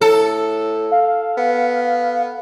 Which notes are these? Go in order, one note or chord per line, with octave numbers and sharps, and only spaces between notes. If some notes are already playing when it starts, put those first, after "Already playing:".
A2 A4
F5
B3